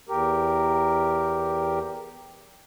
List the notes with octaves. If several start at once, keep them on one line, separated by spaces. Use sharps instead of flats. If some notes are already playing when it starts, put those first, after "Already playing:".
E2 G4 A#4